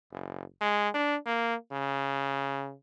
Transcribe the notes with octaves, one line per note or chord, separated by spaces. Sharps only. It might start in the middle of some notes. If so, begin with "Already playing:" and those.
F#1
G#3
D4
A#3
C#3